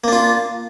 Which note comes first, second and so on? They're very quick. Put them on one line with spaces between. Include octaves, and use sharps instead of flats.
A#3 D4 F4